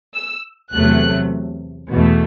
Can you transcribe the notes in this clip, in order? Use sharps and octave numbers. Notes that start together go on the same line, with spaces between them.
E6
E2 C3 F#3 A3 F#6
E2 B2 A3